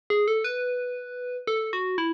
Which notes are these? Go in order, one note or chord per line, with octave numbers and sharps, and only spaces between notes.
G#4
A4
B4
A4
F#4
E4